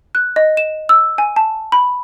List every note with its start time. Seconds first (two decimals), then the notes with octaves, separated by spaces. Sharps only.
0.15 F#6
0.36 D#5
0.57 E7
0.89 E6
1.18 G#5
1.36 A5
1.72 B5